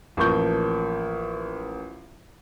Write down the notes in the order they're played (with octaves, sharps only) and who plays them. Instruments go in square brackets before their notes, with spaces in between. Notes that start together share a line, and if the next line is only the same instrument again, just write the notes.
[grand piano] A1 F3 A#3 C#6 G6